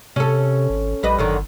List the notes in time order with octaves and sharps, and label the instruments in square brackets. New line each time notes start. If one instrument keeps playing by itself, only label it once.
[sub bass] C3 [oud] C#4 A4
[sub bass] G#1
[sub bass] A#1 [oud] G3 B4 D#5
[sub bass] G1 [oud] F#2 D3 D#3